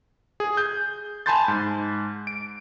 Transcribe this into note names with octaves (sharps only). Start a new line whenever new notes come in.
G#4
G6
G#5 A5 B5 C6 G6 A6
G#2
D7